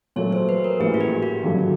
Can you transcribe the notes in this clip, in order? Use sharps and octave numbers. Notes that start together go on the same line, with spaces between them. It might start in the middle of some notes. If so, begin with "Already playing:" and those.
A#2 F#3 A3 C#5
C5
B4
A#4
A1 A2 E3 G3 A#3 G#4
F#4
G4
F#4
G#1 G2 D3 F#3 A3